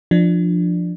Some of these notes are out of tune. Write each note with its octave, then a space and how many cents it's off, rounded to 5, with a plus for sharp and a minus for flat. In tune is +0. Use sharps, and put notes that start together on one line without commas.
F3 +0 D4 +15